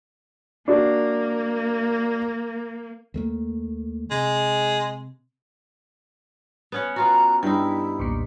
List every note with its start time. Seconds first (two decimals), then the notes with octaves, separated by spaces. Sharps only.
0.68 A#3 D4 F#4
3.14 D#2 A3 A#3
4.11 C3 G#3
6.72 B3 C#4 F#5
6.96 B3 F4 F#4 A#5
7.43 G2 D#4 E4 G5
7.99 B1 E2 A#2